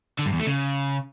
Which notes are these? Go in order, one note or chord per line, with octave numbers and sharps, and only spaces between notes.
D3
G2
E2
A3
C#3